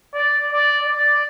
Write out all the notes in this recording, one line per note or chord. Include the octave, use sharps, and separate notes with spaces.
D5
D5
D5